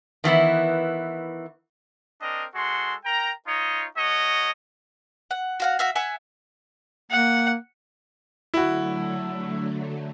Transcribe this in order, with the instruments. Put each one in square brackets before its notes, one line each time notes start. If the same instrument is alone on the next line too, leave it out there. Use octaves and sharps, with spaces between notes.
[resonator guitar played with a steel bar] D#3 E3 B3 E4
[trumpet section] C4 D4 A#4 D#5
G#3 F#4 A4 C6
A#4 G5 A#5
D#4 F4 C#5 D#5
A3 F#4 C#5 D#5
[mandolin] F#5
F#4 F5 F#5
F#4 E5 F5
E5 F#5 G#5 E6
[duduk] A#3 [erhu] F#5
[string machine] D3 F#3 A3 [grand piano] E4 F#4